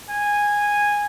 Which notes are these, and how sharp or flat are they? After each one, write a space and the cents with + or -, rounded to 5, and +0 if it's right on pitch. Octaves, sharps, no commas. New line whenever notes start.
G#5 -10